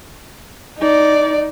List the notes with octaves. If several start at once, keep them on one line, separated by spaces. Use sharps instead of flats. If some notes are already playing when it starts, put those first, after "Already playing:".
D#4 D5